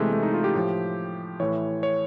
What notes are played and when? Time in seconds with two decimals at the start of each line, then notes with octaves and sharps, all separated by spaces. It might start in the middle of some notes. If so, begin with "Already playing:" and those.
Already playing: C3 E3 G#3 A3
0.13 A3
0.23 D#4
0.34 F4
0.44 G4
0.55 A2 F3
1.40 A2 E3 C#5
1.83 C#5